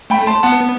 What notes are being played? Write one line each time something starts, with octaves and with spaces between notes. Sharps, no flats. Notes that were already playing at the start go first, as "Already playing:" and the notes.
A3 G5 B5
A5 C6
B3 F#5 A5